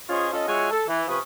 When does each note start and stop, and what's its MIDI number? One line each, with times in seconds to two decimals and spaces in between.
0.10 0.28 61
0.10 0.28 65
0.10 0.28 68
0.10 0.28 72
0.10 0.28 73
0.10 0.28 75
0.33 0.45 61
0.33 0.45 65
0.33 0.45 69
0.33 0.45 75
0.48 0.71 56
0.48 0.71 65
0.48 0.71 66
0.48 0.71 73
0.48 0.71 76
0.48 0.71 80
0.71 0.83 69
0.88 1.03 52
1.08 1.18 48
1.08 1.18 53
1.08 1.18 61
1.08 1.18 71
1.08 1.18 85
1.08 1.18 87